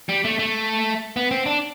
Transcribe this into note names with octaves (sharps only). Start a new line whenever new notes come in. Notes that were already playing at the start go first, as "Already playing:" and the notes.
G3
A3
A3
B3
C4
D4